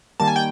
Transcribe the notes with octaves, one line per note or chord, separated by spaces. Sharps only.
D#3 G3 A#3 A5
G#5
G5